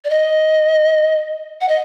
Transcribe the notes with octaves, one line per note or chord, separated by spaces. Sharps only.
D5
D#5
F#5
D#5